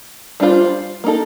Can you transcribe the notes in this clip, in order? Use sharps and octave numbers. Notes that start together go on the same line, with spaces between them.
G3 D4 F4 C5
A#3 D#4 A4